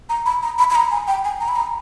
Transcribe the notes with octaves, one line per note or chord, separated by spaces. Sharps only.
A#5
B5
A#5
B5
B5
A#5
G#5
G5
G#5
A#5
B5
A#5